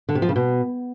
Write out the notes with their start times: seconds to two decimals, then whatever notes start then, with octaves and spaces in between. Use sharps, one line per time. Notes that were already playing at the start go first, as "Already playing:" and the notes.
0.09 D3
0.15 C3
0.22 F3
0.29 C#3
0.36 B2